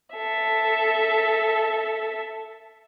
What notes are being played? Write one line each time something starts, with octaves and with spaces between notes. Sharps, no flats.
A4 E5